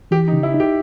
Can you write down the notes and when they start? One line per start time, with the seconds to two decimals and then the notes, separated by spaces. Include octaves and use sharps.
0.11 E3 G4
0.28 D#4
0.33 C#3
0.43 E4
0.54 D#4
0.60 G4